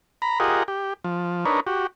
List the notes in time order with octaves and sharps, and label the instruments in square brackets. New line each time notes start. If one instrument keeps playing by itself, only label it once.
[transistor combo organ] A#5 B5
F4 G4 G#4 A#4 D#5 F#5
G4
F3
D4 D#4 A#4 B4 C#5
F#4 G4